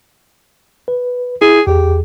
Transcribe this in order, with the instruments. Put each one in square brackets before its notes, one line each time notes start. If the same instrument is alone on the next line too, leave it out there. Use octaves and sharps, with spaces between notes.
[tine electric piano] B4
[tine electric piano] E4 [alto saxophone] G#4
[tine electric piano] E2 G#4 [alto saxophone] G4